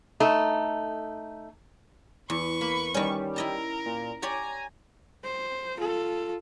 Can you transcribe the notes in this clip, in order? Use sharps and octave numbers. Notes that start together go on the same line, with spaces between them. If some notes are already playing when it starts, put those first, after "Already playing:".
A3 D#4
E2 B4 C#6
A#3 B5
D#3 G3 C#4
E4 A#4 D#5 A5
A#2
G4 C#5 D5 G#5 A#5
C5
F4 A4